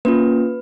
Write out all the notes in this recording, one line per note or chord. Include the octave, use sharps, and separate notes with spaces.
A#3 C#4 F4 B4